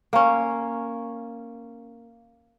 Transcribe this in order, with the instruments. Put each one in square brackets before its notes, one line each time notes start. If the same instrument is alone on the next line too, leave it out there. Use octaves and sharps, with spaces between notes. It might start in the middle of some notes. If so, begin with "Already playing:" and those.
[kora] A#3 C#4